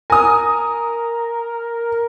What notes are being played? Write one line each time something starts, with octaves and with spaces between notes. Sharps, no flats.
A#4 G#5 D#6